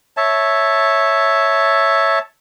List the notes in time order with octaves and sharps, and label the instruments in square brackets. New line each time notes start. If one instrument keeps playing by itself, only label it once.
[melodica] C#5 E5 A5